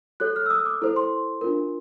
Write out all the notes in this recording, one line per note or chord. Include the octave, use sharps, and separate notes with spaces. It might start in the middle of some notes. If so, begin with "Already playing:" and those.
F#4 A4 C#5 F#6
F6
E6
D#6
D6
E4 A4 C5
C6
D4 F4 A#4